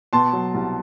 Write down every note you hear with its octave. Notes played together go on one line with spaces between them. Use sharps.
B2 A5 C6
F#3
C2